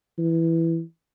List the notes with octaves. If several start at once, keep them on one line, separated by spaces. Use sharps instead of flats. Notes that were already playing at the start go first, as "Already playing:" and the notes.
E3